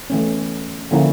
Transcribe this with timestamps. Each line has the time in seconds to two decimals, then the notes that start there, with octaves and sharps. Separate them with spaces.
0.10 E3 A3 C#4
0.91 D3 F3 A#3 C#4 E4